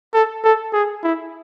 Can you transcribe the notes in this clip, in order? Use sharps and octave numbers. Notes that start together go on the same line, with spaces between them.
A4
A4
G#4
E4